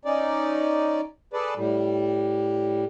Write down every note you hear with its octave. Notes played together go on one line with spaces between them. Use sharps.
C#4 D#4 D5
G#4 A4 B4 D5
A2 G3